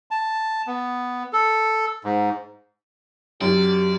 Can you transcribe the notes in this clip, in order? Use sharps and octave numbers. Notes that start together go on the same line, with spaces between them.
A5
B3
A4
G#2
F#2 F#3 G4 D5